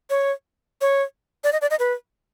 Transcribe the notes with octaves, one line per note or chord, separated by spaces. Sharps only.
C#5
C#5
D5
D#5
D5
D#5
B4